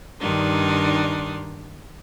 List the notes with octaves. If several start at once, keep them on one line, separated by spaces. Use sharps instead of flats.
G2 D#3 D4 D#4 C6